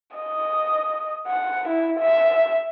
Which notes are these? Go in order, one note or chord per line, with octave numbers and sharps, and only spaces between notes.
D#5
F#5
E4
E5